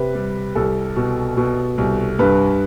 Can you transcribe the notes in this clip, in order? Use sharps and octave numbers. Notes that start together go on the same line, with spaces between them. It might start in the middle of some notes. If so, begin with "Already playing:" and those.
Already playing: C3 B4
G3
C2 A4
B2
B2
C2
G2 B4